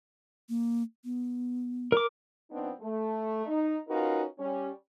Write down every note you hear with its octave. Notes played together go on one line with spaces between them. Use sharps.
A#3
B3
A#4 D6
F3 B3 C4 D4 D#4
A3
D#4
C#4 D#4 F4 F#4 A#4 B4
G3 C#4